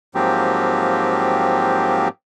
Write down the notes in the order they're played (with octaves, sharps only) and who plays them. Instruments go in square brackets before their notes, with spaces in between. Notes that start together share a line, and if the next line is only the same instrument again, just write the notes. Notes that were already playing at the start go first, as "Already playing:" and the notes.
[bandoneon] G#2 F3 F#3 A#3 C4 G4